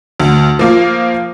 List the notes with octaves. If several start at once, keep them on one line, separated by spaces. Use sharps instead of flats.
D2
F3 A#3 F4